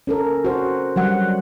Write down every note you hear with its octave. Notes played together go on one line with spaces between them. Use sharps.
C#4 A4 A#4
F#4 C5
F#3 G3 F#5